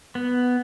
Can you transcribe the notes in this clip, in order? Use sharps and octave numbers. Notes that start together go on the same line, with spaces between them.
B3